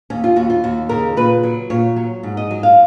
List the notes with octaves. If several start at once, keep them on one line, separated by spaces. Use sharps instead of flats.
D#2 C#4
F4
D#2 F#4
F4
D#2 F#4
C#3 A#4
A#2 B4
F#3
A#2 C#5
F#3
G#2
D#5
F#3
F5